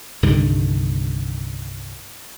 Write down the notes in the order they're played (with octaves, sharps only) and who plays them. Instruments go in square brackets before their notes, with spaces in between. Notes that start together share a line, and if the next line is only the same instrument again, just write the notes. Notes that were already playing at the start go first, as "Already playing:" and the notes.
[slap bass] C2 G2 D3 D#3